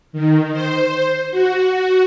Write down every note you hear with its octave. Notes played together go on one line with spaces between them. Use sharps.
D#3
C5
F#4